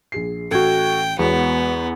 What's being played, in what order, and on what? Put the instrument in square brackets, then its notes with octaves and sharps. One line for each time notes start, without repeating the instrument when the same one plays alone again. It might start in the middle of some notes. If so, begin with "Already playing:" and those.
[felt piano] A#1 G#4 C7
[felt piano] A1 G#6 [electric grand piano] F#4 A4 [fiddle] G5
[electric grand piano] E2 [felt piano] G#3 F#4 C#5 [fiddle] B3